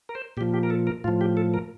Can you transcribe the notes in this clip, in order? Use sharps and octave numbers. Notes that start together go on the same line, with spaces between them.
A#4
C5
A#2 F3 G4
G4
A#4
A4
A#4
A2 F3 F4
G4
A4
A#4